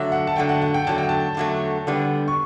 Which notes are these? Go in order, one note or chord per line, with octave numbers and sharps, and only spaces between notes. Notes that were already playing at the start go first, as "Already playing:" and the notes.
Already playing: D3 F#3 A3 E5
F#5
A5
D3 F#3 A3 G5
F#5
F#5
G5
D3 F#3 A3 A5
G5
A5
D3 F#3 A3
D3 G3 B3
C#6